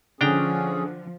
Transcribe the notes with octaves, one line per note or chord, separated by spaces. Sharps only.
D3 F3 C#4 D4 G#4 G5 A#5